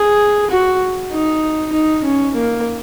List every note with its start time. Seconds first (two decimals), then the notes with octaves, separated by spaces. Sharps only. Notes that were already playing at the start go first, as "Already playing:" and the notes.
Already playing: G#4
0.51 F#4
1.12 D#4
1.72 D#4
2.04 C#4
2.35 A#3